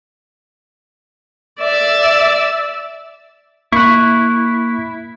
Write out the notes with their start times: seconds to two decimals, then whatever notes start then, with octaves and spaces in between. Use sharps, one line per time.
1.61 D5 E5
3.72 A#3 E4 C#6 F#6